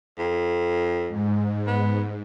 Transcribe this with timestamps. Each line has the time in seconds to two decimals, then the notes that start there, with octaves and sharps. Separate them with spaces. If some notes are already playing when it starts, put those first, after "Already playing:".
0.18 F2
1.09 G#2
1.67 B3